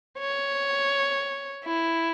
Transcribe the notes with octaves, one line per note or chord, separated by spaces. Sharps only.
C#5
E4